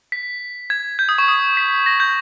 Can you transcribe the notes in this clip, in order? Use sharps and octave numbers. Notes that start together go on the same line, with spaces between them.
B6
G#6
G6
D#6
C#6
D#6
B6
A#6
G6